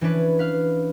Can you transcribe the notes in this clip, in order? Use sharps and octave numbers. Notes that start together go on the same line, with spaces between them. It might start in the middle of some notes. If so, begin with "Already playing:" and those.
E3 C#4 D4 B4
B4 F5 F6